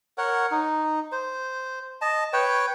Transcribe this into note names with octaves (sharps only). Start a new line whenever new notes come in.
A#4 C#5 F#5
D#4
C5
D#5 A5
B4 C#5 G5